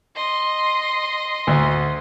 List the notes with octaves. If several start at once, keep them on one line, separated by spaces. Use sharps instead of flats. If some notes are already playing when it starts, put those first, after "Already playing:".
D#5 C6
D2